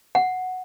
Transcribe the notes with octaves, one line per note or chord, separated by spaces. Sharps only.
F#5